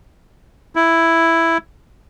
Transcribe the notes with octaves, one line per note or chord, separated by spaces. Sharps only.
E4